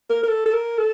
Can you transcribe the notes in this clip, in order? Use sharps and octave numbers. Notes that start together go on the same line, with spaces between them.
A#4
A#4
A4
A4
A#4
A4